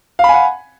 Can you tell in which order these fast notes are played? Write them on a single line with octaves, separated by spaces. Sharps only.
F5 B5 G#5 F#5